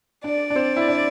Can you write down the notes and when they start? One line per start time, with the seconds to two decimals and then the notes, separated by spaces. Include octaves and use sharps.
0.24 D4 D5
0.50 D4
0.56 C4
0.77 E4
0.88 D4